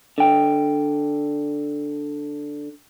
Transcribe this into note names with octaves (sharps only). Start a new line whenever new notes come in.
D3 G5